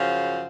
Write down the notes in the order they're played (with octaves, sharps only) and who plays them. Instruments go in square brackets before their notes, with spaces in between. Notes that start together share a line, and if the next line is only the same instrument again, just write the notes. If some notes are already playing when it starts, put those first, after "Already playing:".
Already playing: [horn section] F#2 C#3 F3